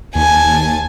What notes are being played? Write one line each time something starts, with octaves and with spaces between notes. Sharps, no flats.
D#2 G#5 A5